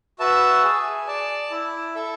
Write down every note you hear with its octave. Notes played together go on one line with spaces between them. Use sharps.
F#4 B4 E5 A5
G#4
D5 A5
E4
A4 E5